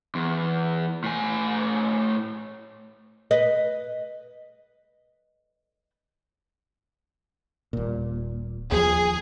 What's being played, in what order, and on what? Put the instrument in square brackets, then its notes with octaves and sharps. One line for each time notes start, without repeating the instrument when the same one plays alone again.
[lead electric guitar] E2
A2 G#5
[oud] B4 D#5
[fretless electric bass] D#1 A#2
[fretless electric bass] D#2 F3 [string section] G#4